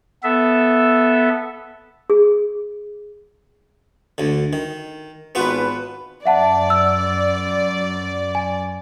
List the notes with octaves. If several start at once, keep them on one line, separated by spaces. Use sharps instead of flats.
B3 A4 E5
G#4
D2 D3
D#3
G#1 B3 F4 F#4 B4
F#2 D5 E5 F#5 A5
E6
G#5